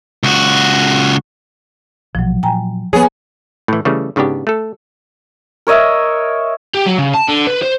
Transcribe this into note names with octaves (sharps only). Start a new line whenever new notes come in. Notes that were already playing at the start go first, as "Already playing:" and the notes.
C#2 F#4
A#1 B2 F3 F#3
A#2 F#3 G5 G#5 A#5
F3 G3 A#3 B3 G#4 C#5
A2 E3
C#3 E3 G3 A3
G#2 C#3 B3 D4 G4
A3 A4
A#4 C#5 D#5 E5
G4
F#3
C#3
A5
D3
B4
C5